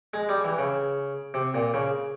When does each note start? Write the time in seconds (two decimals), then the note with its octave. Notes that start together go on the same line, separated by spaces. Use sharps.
0.14 G#3
0.29 G3
0.44 E3
0.58 C#3
1.34 C3
1.54 A#2
1.74 C#3